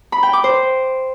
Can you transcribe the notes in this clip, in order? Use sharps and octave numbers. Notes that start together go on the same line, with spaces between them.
B5
G5
D6
C5